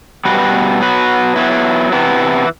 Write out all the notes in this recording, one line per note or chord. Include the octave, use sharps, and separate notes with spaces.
B2 G3 B3 F#4 B4
F#3 B3 F#4 B4
F#3 B3 E4
C3 E3 B3 E4